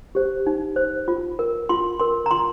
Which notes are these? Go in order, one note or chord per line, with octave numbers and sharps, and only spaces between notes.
G4 C5
D#4
C5
F4
A#4
F4 C6
A#4 C6
A#5
F4 C6